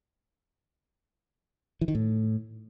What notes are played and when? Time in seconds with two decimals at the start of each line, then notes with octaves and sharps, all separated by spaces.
1.81 E3
1.88 D#3
1.95 A2